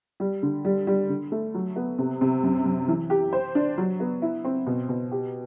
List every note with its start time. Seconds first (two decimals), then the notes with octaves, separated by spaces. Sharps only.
0.20 G3
0.43 D3
0.65 G3
0.87 G3
1.09 D3
1.32 A3
1.54 F#3
1.76 B3
1.98 C3
2.21 C3
2.43 F#2
2.66 F#2
2.88 E3
3.10 G4
3.32 C5
3.55 D4
3.78 F#3
4.00 B3
4.22 E4
4.45 C4
4.67 B2
4.89 B2
5.11 G4